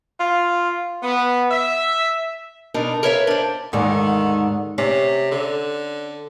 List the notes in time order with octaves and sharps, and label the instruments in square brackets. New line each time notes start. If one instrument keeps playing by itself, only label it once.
[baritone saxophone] F4
[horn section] B3
E5
[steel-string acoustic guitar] B2 D4 D#4 A#4
A#4 B4 C#5 E5 F5
D4 C5
[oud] D#2 G#2 D3 [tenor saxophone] D#3
[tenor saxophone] C3 [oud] C#4
[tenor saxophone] D3